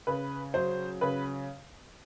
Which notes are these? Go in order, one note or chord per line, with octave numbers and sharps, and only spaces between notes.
C#3 B4
F#3 C5
C#3 B4